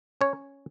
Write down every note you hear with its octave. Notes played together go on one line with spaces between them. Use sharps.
C#4 C#5